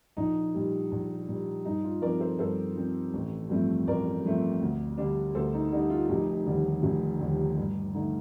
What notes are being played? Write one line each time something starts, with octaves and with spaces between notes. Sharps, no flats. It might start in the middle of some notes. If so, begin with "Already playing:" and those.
A#1 D#4
A#2 G3
A#1
A#2 G3
G2 D#4
F4
F3 C4 A#4 D5
A4 C5
G2 A4 C5
F3 C4
A1
G2 F3 A3 C4
A1 A#4 D5
G2 F3 A3 C4
D2
D3 G3 D4
D2 A4 C5
D#4
D3 G3 D4 D#4
F4
F1 D#4 G4
D#2 D3 G3
F1
D#2 D3 G3
G2
D3 A3 D#4